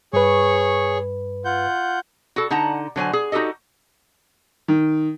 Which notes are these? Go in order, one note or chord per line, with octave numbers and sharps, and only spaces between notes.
G2 G#4 B4 C#5 C#6
F4 F#5 G6
F#4 A4
D3 D#4 F#5 A5 A#5
D3 F#3 C5 G#5
G#4
D#4 F#4 G4 A4 D#5
D#3